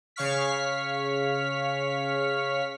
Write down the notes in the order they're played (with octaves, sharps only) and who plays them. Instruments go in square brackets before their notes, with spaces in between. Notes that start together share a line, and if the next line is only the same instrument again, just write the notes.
[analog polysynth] C#3 C#5 F5 C#6 F6 B6